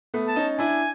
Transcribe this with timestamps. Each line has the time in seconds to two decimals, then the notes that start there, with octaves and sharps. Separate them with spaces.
0.14 A3 B3
0.28 A5
0.36 C#4 D#4
0.58 D4 E4 G#5